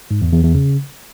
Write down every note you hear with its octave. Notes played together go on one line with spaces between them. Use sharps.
G#2
E2
E2
E2
C#3